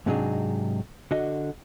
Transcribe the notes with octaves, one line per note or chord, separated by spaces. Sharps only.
G#2 C3 F#3 D4 D#4 G#4
D3 F#4 D#5